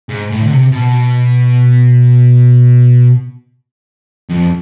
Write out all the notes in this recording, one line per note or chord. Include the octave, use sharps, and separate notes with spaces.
G#2
A2
D3
C3
B2
F2